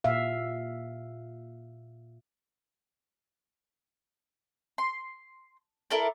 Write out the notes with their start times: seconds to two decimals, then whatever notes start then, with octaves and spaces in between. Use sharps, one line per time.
0.04 A#2 E5 F5
4.78 C6
5.90 E4 A4 A#4 D5